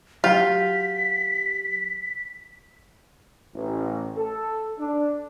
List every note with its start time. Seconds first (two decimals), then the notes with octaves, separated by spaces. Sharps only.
0.24 F#3 F4 G4 B6
3.55 A1
4.17 A4
4.79 D4